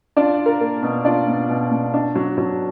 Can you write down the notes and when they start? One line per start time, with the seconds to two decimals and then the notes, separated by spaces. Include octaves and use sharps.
0.16 D4 F4 D5
0.39 F4
0.46 A#4
0.61 A#3
0.83 B2
1.04 D4 F4 D5
1.27 B2
1.49 B2
1.71 B2
1.94 D4
2.15 F#3
2.38 F#3